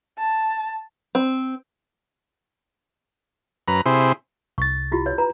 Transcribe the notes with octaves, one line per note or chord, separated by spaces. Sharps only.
A5
C4
F#2 B4 A#5
C3 E4 G#4 C5
C2 C#6 A6
E4 F4 G4
C#5
B4 A#5